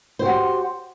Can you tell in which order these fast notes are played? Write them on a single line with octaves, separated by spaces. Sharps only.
C5 G4 F#4